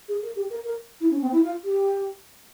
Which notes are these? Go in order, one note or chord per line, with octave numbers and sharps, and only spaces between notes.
G#4
A#4
G4
A#4
A#4
E4
C#4
C4
E4
F4
G4